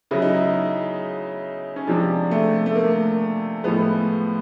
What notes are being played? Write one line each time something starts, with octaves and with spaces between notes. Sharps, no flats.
C#3 F#3 E4
D#4
E4
C#4
C3 F3 G#3 D4
A3
A3
A#3
A2 F3 G#3 B3